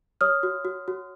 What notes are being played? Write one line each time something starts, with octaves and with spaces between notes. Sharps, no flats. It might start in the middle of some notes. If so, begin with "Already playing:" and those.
C#5 D#6 F6
F#4
F#4
F#4